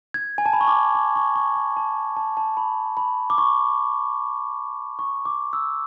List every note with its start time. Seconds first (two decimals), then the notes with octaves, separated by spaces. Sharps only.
0.14 G#6
0.38 G#5
0.46 A5
0.53 B5
0.61 C#6
0.68 D6
0.95 D6
1.16 C#6
1.36 C#6
1.56 B5
1.77 A5
2.16 A5
2.37 A5
2.57 B5
2.97 B5
3.30 D6
3.38 C#6
4.99 C#6
5.25 D6
5.53 E6